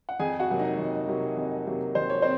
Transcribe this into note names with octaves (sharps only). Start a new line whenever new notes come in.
F#5
F2 G#4 G#5
F#4 F#5
C3 F#3 A#3
D#4 D#5
F2
C3 F#3 A#3
F2
C3 F#3 A#3
F2 C5
C#5
C4 C5